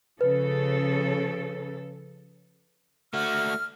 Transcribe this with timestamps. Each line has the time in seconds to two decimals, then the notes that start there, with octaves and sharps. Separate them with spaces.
0.21 C#3 F3 A4 B4
3.14 A3 F#4 F6